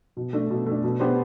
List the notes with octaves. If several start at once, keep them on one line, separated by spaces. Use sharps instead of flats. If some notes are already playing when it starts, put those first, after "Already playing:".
B2
A3 D4
B2
A3 D4
B2
B3 D4 G4 C5